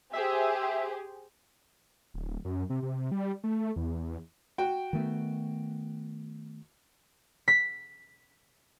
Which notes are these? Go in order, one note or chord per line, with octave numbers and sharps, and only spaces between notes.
G4 G#4 C5 E5
D1
F#2
C3
C3
G3
A3
E2
F#4 G5
D#3 A3 B3
B6